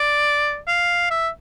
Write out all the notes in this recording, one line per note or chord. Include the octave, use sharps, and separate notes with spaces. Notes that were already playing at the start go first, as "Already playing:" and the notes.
Already playing: D5
F5
E5